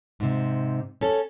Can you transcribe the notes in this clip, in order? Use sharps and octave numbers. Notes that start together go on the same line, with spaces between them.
G#2 C3
C#4 A4